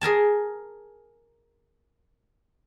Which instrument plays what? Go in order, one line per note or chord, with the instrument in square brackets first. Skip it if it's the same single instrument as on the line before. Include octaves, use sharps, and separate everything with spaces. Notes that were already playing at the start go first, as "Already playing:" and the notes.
[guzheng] G#4 A#4 G#5 A5